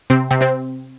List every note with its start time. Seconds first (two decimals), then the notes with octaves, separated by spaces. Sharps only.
0.10 C3 C4
0.31 C3 C4
0.41 C3 C4